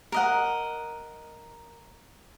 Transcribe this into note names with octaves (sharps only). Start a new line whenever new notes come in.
A#4 D#5 F#5